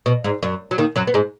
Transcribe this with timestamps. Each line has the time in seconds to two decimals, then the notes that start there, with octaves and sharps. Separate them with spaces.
0.06 B2
0.24 G#2
0.43 F#2
0.71 F#3
0.78 D#2 D#3
0.96 F#2 F#3
1.07 B3
1.14 G#2 G#3